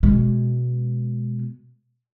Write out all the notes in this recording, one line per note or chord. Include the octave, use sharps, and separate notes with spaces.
B2 G#3